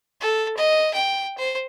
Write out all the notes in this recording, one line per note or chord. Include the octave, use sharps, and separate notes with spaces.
A4
D#5
G5
C5